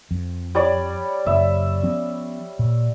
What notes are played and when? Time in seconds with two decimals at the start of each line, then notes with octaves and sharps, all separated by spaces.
0.11 F2
0.55 G3 C#5 D5
1.26 F#1 E5
1.83 F3 B3 C#4
2.59 A#2